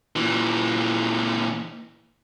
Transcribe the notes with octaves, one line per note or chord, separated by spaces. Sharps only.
A#2 E3